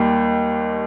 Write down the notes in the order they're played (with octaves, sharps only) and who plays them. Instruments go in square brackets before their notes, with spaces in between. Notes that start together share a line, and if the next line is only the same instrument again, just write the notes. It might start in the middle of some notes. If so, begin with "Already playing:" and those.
Already playing: [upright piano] D#2 D#3 G3